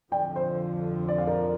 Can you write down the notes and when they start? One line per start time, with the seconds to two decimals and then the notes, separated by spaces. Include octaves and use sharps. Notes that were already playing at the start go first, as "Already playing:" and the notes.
0.12 F2 D3 F3 D5 G5
0.36 C5
1.08 D5
1.18 F5
1.27 A#4 D5